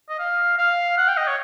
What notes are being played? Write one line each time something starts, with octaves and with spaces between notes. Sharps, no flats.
D#5
F5
F5
F#5
G5
D#5
C#5